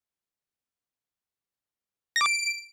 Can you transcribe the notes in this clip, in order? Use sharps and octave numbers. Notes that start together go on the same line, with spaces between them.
A#6
D6
D7